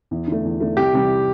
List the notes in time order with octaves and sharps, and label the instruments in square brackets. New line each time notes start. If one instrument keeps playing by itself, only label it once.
[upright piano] E2
D3 A3
E2
D3 A3
[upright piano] C2 [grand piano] G4
[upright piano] C3 E3 G3